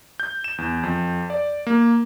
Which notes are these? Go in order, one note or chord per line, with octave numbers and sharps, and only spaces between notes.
G6
E7
E2
F2
D5
A#3